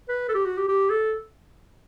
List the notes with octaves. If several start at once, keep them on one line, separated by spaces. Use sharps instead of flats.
B4
A4
G4
F#4
G4
G4
A4